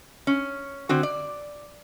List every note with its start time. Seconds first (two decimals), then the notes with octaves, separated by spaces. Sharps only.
0.27 C#4
0.89 D3 C4 F#4
1.03 D5